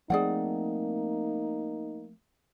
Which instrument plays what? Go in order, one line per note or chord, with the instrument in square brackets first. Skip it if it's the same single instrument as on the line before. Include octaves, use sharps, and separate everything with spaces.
[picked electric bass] F3 A3 C4 [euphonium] A#3 [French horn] D#4 [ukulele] G#4 D5 F#5